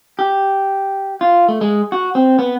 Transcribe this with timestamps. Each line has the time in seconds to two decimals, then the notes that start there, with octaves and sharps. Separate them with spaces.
0.19 G4
1.21 F4
1.48 A3
1.61 G#3
1.92 F#4
2.15 C4
2.39 B3